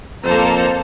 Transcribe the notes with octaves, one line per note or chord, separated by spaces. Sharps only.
F2 A#3 A4 C5 A#5